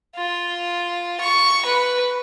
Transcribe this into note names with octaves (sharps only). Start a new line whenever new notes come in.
F4
C#6
B4